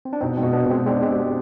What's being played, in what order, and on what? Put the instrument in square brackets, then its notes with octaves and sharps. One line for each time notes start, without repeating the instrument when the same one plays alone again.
[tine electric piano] C4
D4
[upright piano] B2 [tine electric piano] C4 D#4
[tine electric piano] G#3 C4
[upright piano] B2
[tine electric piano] B3 D4
[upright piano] B2
[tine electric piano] G#3 C4
[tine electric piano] G#3 C4 [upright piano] D4
[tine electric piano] G#3 C4
[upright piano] G4